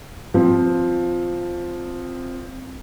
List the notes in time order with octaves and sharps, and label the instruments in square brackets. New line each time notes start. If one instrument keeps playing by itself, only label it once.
[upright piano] F3 C4